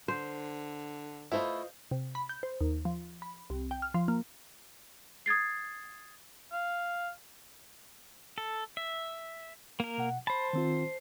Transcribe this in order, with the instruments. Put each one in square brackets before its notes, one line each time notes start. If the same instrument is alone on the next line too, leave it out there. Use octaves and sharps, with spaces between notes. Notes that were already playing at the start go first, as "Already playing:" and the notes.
[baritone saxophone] D3 [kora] C5
[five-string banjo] A3 E4 [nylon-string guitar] F4 C5 D#5
[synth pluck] C3
B5
G6
C5
D#2
F3
B5
C2
G5
F6
F3
A#3
[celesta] D#6 G#6 A6 C7
[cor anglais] F5
[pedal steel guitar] A4
E5
A#3 A#4
[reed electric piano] B2 F#5
[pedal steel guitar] C5 A5 [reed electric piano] B5
[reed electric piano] D#3 C4 F4